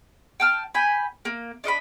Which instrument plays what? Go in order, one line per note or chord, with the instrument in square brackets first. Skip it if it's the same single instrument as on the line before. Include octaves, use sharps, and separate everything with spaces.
[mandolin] G5 A5 F6
G5 G#5 B5
A#3
D4 D#5 F#5 B5